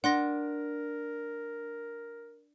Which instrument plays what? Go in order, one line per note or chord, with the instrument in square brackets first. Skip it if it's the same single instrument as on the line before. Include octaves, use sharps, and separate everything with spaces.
[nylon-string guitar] D4 [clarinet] A#4 [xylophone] F#5 C6 A#6